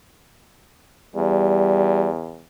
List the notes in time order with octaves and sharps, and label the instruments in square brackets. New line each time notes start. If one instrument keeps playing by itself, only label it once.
[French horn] E2 [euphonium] G3